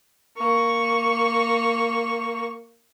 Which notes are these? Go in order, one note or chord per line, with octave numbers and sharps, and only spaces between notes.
A#3 C#6